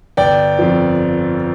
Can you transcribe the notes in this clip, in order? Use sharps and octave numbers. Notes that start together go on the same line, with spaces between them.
G1 D5 G5
F2 F3